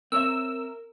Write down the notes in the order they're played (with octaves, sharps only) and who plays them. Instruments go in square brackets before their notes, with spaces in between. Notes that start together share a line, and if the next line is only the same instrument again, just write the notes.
[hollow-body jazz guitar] C4 C#5 E5 [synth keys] A#4 [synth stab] E6